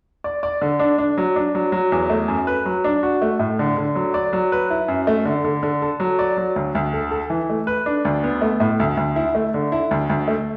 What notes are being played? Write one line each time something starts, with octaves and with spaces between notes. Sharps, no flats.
D5
D5
D3
D4
D4
F#3
D4
F#3
F#3
E2
A3
F#2
B4
F#3
D4
F#4
A3
A2
D3
D3
F#3
D5
F#3
B4
E4
F#2
A3
D3
D3
D3
A4
F#3
D5
F#3
D2
D2
A4
A4
E3
A3
B4
D4
D2
B3
A3
A2
D2
D2
E4
A3
D3
E4
D2
D2
A3